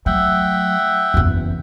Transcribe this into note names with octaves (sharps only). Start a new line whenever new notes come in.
F#3 A3 E5 F#5 G5
F#1 E2